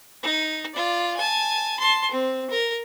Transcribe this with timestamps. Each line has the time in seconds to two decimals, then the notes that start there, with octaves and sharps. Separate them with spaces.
0.23 D#4
0.74 F4 D5
1.17 G#5 A5
1.80 A5 C6
2.11 C4
2.51 A#4